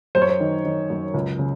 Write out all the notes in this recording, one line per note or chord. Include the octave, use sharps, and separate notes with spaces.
F#2 C5
C#5
C5
D#3
D#3
F#2
C#2
C#3